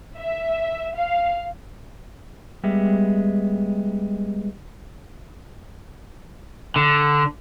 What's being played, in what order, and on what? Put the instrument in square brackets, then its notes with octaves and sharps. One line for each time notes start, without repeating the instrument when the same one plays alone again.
[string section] E5
F5
[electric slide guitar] G3 G#3 B3 E5
[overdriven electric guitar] D3